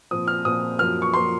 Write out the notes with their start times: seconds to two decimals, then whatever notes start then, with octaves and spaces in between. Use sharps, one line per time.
0.11 A#2 F3 C4 D#6
0.27 F6
0.45 A#2 F3 C4 D#6
0.79 F#2 F3 A#3 F6
1.02 C#6
1.14 F3 A#3 C6